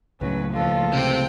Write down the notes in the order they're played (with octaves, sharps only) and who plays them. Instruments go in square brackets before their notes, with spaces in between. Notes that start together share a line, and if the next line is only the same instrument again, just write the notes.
[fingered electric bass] C#2 A2 [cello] F#3 [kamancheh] C#4 B4
[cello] D#2 F3 [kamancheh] F4 A4
[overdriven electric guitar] C3 C4 [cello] G5